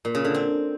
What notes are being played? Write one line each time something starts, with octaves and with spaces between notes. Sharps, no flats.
A#2
C#3
D3
C4